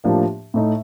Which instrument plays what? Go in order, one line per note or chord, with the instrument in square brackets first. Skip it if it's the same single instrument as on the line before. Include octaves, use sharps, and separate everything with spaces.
[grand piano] A2 F3 A#3 D4 G4
A2 A3 D#4